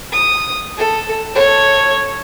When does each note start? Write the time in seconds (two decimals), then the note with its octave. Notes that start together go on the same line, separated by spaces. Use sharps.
0.13 D#6
0.77 A4
1.32 A4 C#5